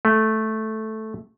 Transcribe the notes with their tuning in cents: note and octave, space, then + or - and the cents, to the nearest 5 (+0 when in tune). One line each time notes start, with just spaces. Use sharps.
A3 -5